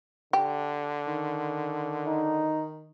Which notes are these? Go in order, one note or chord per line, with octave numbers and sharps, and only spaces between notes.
D3 G4
D#3
D#4